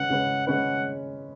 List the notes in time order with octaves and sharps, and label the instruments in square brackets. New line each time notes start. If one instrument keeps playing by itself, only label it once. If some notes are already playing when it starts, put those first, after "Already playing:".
Already playing: [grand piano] C#3 G#3 C#4 G#4 B4 [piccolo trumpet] F#5
[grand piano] C#3 G#3 C#4 G#4 B4
[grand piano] C#3 G#3 C#4 G#4 B4 [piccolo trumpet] F#5